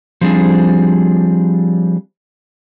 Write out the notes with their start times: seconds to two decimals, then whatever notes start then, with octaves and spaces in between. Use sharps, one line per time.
0.21 F3 G3 C4 D4 G#4